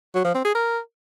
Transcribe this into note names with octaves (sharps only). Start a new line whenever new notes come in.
F#3
F3
C4
G#4
A#4